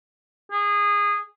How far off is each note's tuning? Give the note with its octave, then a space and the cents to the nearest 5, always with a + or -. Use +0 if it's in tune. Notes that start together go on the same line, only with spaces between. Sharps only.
G#4 -20